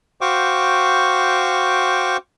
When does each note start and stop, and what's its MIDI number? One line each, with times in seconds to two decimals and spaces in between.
0.21 2.17 66
0.21 2.17 72
0.21 2.17 77
0.21 2.17 79
0.21 2.17 85
0.21 2.17 86